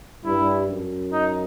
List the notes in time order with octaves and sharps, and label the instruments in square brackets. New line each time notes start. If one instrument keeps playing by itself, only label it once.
[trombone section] G2 [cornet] E4
[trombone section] F#2
[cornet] D#4